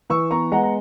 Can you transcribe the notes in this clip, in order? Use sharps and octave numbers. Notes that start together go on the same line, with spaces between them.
E3 C#6 E6
B3 A#5 C#6
G#3 F#5 A#5
A#5